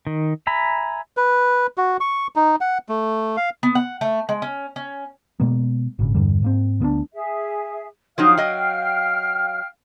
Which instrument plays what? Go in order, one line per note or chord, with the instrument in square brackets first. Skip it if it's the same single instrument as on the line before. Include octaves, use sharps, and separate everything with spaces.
[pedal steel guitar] D#3
E5 G#5 A#5 B5
[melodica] B4
F#4
C#6
D#4
F#5
A3
F5
[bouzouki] B3
F#5
A3
G#3
C#4
C#4
[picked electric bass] B2 G#3 A#3 B3
G#1 A#2 C#3
E2 G2 D3 G3
G#2 A#3 C4
D2 B3 C4 D4
[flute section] G#4 E5
[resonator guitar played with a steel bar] F3 F#3 D#4 [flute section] F5 G5 F6
[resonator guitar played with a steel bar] F#3 D#5